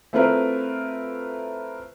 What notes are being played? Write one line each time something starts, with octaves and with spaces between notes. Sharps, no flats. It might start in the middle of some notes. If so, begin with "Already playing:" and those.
A3 C4 E4 F4 A#4 B4